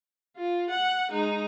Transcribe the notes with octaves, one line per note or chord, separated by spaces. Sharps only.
F4
F#5
G#3 D#4